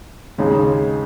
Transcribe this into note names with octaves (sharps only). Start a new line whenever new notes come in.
D#2 C#3 G#3 D#4